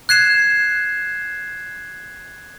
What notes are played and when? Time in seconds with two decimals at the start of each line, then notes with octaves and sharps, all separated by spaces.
0.09 F#6 G#6 C7 E7